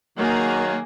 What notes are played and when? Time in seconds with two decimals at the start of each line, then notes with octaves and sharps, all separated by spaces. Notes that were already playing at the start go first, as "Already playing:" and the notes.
0.18 D#3 F#3 A#3 G#4